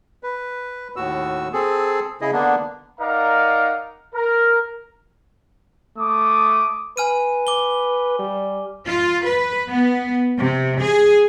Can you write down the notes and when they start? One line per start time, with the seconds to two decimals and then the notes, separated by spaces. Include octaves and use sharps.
0.23 B4
0.96 D#2 A2 F#4 E6
1.53 C4 G#4 A4
2.21 C#3 E4 G#4 D#5
2.33 D3 A#3 B3 D4
2.99 D#4 A#4 D5 F5 F#5 A#5
4.14 A#4
5.98 A3 D6 D#6
6.97 B4 G#5 F6 D#7
7.47 D6 G7
8.19 G3
8.88 F4
9.25 B4
9.69 B3
10.38 C3
10.82 G#4